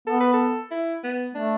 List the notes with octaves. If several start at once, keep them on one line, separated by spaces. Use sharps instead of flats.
B3 A4
B4
A4
E4
B3
A3 D4